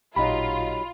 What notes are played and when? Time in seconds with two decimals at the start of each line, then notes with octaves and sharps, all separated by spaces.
0.16 A1 A#2 F#3 D#4 F4 G4 D#5 B5